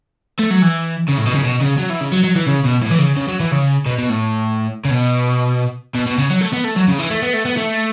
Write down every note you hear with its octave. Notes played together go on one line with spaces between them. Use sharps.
A3
F#3
E3
C#3
A2
B2
C#3
B2
C#3
F#3
E3
C#3
F#3
F#3
E3
C#3
B2
A2
E3
C#3
C#3
F#3
E3
C#3
B2
B2
A2
C#3
B2
B2
B2
C#3
F#3
A3
B3
A3
F#3
C#3
E3
A3
B3
A3
B3
A3